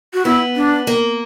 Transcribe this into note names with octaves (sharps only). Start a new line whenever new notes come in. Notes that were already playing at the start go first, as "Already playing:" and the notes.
F#4
B3 E4
D4
A#3